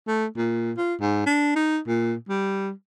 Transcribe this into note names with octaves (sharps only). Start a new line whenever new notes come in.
A3
A#2
F4
G#2
D4
D#4
A#2
G3